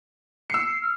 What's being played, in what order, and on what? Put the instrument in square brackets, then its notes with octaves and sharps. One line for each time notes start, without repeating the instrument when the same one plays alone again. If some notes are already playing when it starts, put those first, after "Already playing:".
[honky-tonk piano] E6 C#7 [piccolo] C7
[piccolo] C7
F6